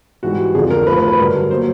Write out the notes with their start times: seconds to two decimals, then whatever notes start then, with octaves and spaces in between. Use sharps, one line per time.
0.23 G#2 E3 G3 F#4
0.54 F2 D3 F3 G#4
0.70 A#4
0.86 A2 F3 B4
0.97 B4
1.08 B4
1.18 G2 D3 F#3 A#4
1.50 A#2 F#3 C5